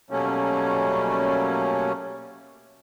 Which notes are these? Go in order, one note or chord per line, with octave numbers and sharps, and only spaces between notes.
B2 F#3 G3 A3 A#3 C#4